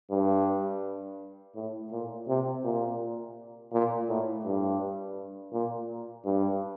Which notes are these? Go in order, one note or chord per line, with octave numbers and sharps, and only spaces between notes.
G2
A2
A#2
C3
A#2
A#2
A2
G2
A#2
G2